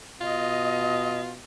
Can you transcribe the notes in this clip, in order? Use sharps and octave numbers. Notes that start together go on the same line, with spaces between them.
B2 F4 D#5